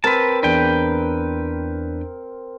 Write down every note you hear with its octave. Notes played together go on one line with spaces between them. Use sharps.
C4 A#4 B4 A5
E2 D4 B4 G5